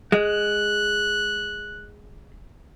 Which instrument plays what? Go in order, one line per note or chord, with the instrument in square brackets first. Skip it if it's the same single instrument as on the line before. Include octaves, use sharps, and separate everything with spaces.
[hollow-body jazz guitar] G#3 [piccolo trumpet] F#6